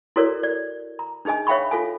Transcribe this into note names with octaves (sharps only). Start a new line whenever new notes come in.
E4 F#4 A4 A#4 C#5 D5
D5
A#5
D4 D#4 G#4 D#5 G#5
C#5 E5 F5 G5 B5 C#6
F4 A4 F5 G#5